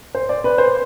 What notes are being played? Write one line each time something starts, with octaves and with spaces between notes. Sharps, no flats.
C5
D5
B4
C5